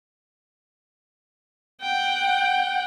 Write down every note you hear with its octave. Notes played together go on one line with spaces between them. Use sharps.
F#5 G5